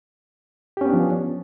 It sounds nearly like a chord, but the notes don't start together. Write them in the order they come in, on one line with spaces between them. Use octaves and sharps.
G4 C#4 B3 D4 F3